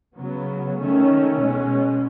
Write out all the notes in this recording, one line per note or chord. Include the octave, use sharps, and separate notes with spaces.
C#3 F#3 B3
D#3 A3 C#4
B2 G#3 C#4